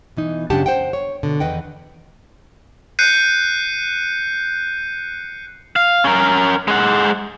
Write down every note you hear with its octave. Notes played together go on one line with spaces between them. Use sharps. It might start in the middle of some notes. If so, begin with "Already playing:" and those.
B2 E3 D#4
F#2 C#3 D4 G4 F#5 A5
C5 F#5 G5
C#5
B2 D3
E2 D#3 B4 D#5 F#5 G5
F#6 G6 C7 C#7 D#7
F5
C#4 A#4
G#3 F#5